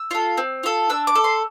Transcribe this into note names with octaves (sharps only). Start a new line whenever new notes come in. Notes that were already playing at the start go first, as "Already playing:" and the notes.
Already playing: E6
F4 A4
C4
F4 A4
D4 E6
D6
A4
C6